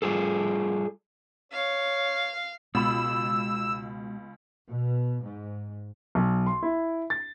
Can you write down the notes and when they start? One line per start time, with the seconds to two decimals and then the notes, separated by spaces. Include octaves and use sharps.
0.02 G3 F4 G#4 A4
1.52 C#5 F5
2.75 C#2 B2 G#3 B5 E6
4.66 B2
5.22 G#2
6.15 B1
6.46 C6
6.63 E4
7.10 A6